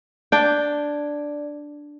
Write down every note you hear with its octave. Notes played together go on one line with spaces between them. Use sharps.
D4 D5 G5